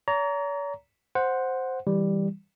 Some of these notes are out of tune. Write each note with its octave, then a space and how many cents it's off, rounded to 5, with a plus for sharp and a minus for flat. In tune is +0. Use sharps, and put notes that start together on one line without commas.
C#5 +45 A#5 +0
C5 +0 F#5 -5
E3 -15 G3 +5